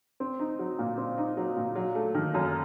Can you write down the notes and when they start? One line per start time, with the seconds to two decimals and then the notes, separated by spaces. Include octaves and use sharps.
0.20 C4
0.39 D#4
0.59 F#3
0.79 A#2
0.98 C4
1.18 D#4
1.37 F#3
1.56 A#2
1.75 F#3
1.95 A3
2.15 D#3
2.34 F#2